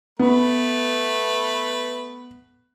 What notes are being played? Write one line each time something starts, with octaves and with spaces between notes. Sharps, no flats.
A3 B3 B4